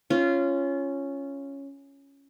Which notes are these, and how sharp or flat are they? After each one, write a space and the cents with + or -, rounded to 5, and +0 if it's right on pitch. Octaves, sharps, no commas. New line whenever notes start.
C#4 +0 F4 -20